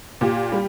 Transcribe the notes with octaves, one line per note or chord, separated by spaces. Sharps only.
A#2 G4
G3